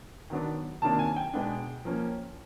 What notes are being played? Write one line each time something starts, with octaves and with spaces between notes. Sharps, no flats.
D#3 F#3 B3 D4
C3 D#3 F#3 A#3 D4 A5
G#5
G5
B2 G#3 B3 D4
F3 A#3 C#4